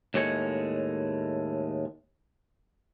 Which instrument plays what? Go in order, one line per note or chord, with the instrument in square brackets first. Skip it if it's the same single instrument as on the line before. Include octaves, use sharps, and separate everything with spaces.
[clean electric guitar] D#2 A2 G#3 C#5